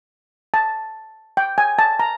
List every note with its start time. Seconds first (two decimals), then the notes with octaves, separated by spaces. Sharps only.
0.54 A5
1.37 G5
1.58 G#5
1.79 A5
2.00 A#5